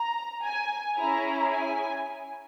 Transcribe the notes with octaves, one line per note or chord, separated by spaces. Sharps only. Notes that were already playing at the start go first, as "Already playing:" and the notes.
Already playing: A#5
G#5
C#4 E4 G#4 A#5
G#5